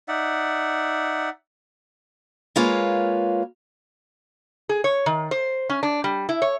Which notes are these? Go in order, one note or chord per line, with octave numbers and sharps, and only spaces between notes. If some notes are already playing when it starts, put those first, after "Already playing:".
D#4 D5 E5 F#5
G#3 A#3 F4 B4 C#5
G#4
C#5
D#3
C5
C#4
D4
G3
E4
C#5